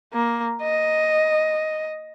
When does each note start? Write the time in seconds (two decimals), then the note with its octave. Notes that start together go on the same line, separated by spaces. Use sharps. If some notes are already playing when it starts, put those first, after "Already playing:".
0.13 A#3
0.62 D#5